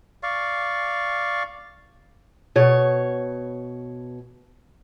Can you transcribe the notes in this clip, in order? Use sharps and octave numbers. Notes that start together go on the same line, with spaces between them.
D5 F5 C#6
B2 C#5